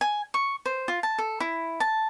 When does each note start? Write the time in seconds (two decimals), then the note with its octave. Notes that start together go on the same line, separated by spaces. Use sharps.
0.01 G#5
0.34 C#6
0.66 C5
0.88 F4
1.03 A5
1.18 A4
1.40 E4
1.80 A5